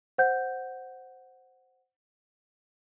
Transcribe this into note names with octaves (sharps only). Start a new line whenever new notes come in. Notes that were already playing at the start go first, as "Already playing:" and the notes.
C5 F#5 G6